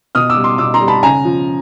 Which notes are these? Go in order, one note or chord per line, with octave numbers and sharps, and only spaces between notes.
B2 D#6 F6
D6 E6
G3
C6 D6
B2 D6 E6
A#5 C6
G3
A5 B5
C#3 G#5 A#5
F3